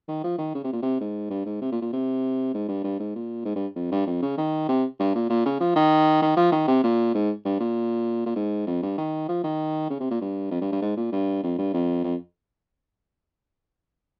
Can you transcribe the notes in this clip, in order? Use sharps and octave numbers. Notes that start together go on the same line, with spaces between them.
D#3
F3
D#3
C#3
C3
A#2
C3
G#2
G2
G#2
C3
A#2
A#2
C3
G#2
G2
G2
G#2
A#2
G#2
G2
F2
G2
F2
C#3
D#3
C3
G2
A#2
A#2
C#3
F3
D#3
D#3
F3
D#3
C3
A#2
G#2
G2
A#2
A#2
G#2
F2
G2
D#3
F3
D#3
C#3
C3
A#2
G2
F2
G2
G2
G#2
A#2
G2
F2
G2
F2
F2